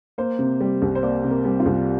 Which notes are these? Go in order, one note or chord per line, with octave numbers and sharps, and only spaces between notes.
A#3 C5
C3
G3
C2
C5
A#3 D5
C3
A#4
G3
F4
C2